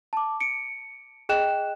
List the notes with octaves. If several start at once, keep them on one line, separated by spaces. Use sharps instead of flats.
A5 D6
C#7 D7
G#4 D#5 G5 F#6 E7